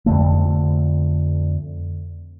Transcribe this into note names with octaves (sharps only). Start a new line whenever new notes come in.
F2 D3 A3